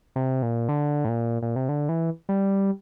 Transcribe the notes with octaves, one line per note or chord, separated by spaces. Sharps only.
C3
A#2
D3
A2
A#2
A#2
C3
D3
E3
G3